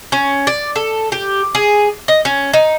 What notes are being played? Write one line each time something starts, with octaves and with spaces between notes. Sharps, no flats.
C#4
D5
A4
G4
G#4
D#5
C#4
D#4